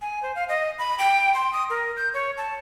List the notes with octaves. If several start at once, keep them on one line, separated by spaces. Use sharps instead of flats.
G#5
C5
F5
D#5
B5
G5
C6
D#6
A#4
G6
C#5
A5